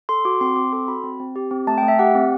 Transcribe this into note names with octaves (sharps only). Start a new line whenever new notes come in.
A4 C6
F#4 D6
C4 C6
C4 D6
A4 C6
F#4 B5
C4
C4
G4
C4
A3 A5
G5
A3
E5
G4 F#5
C4